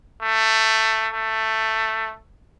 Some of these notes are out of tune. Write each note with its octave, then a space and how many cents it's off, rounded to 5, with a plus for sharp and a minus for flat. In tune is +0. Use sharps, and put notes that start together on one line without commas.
A3 +10
A3 +10